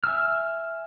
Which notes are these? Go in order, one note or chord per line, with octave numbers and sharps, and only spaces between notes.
E5 G#5 E6 F6